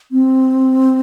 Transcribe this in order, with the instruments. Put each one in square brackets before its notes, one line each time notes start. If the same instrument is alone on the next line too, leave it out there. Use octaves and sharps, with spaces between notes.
[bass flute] C4